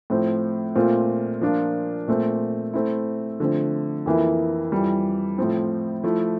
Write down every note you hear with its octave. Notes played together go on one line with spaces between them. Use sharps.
A2 F3 C4
A#2 A3 C4 F4
F3 A#3 D4 F4
A#2 A3 C4
A3 C4 E4
D3 F3 A3 C4
F2 E3 A#3 E4
F2 E3 G3
A2 F3 C4
F3 A3 E4